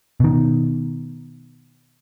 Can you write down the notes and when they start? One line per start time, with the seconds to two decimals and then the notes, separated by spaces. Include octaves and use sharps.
0.20 B2 D#3